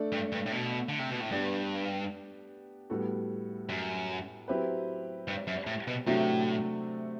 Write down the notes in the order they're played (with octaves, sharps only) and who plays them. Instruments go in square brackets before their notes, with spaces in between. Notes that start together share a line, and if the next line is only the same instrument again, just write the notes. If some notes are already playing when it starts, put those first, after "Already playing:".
Already playing: [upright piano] A3 D4 A4 D5
[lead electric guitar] G2
G2
A2
B2
D3
C3
B2
A2
[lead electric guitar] G2 [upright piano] B3 D4 G4 D5
[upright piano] A2 G3 B3 F#4 A4
[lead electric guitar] F#2
[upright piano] F#3 C4 E4 G4 B4
[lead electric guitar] G2
F#2
A2
B2
[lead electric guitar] A2 [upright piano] C3 F#3 A3 D4 F#4